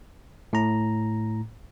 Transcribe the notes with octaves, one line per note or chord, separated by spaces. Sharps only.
A2 A#5